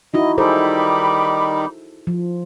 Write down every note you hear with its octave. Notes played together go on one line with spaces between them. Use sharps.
D#4 E4 F#4 D#5
D#3 G3 D#4 G#4 A4 C5 B5 D6
F3